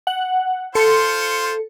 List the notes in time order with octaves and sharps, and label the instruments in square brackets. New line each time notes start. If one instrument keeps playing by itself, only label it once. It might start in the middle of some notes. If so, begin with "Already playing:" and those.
[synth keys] F#5
[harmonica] F4 C5 [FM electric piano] A4 [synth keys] C#7